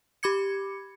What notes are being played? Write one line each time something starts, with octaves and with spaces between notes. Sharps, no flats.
G4 B5 D6 G#6 C#7